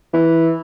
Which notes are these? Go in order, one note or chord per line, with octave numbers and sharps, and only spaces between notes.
E3